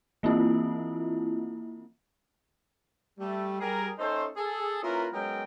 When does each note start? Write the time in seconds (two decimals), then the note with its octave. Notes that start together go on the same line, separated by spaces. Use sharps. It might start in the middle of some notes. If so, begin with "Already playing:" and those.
0.23 E3 A#3 C4 E4 F4
3.19 G3 A3
3.60 G3 G#4 A#4
3.99 A3 C#4 D#4 A4 C5
4.37 G#4 A4
4.83 A#3 C#4 E4 F4 A#4 B4
5.13 F#3 G#3 B3 C#4 A#4 G5